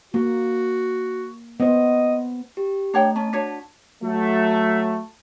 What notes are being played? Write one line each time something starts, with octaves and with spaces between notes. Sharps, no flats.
A#3 F#4
B3 C5 D#5
G4
A3 D4 C#5 G5
C#4 A5
D4 F#4 C#5 B6
F#3 A3